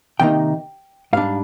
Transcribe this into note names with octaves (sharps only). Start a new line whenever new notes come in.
C3 D#3 A#3 D#4 G5
G#2 G3 D4 F5